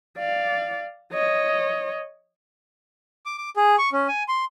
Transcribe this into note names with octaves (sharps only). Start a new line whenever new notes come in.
D5 F5
C#5 D#5
D6
D6
G#4
C#6
C#4
G#5
C6